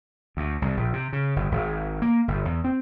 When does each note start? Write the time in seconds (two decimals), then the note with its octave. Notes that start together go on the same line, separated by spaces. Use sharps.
0.37 D2
0.62 C2
0.77 A#1
0.93 C3
1.13 C#3
1.36 G1
1.52 G#1
2.02 A#3
2.28 G1
2.45 E2
2.64 C4